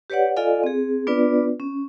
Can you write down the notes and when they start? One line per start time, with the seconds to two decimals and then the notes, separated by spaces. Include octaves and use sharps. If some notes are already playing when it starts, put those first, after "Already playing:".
0.10 G4 B4 C#5 D5 F#5
0.36 F4 A4 D5 D#5 F5 G#5
0.64 C4 G#4
1.07 B3 D4 F4 B4 D5
1.60 C#4